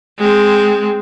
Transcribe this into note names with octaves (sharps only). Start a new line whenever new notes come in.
G#3 C4